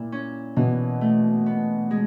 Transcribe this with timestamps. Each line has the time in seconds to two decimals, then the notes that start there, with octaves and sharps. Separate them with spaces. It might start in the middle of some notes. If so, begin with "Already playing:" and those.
Already playing: A#2 E4
0.12 C#4
0.56 B2 E3
1.01 A3
1.46 B3
1.91 G#3